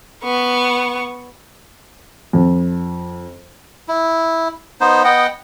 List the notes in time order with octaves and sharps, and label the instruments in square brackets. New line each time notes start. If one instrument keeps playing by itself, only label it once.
[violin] B3 C#6
[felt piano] F2
[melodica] E4
B3 D#4 C5
B3 D#5 F#5 G5